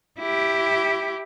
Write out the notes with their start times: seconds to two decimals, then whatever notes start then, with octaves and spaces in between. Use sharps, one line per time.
0.20 E4 G4